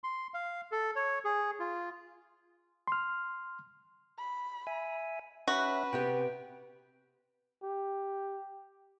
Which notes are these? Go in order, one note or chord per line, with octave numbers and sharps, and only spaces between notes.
C6
F5
A4
C#5
G#4
F4
C6 F6
B5
E5 G#5
C#4 F#4 B4 E5
C3 B3 G4 G5
G4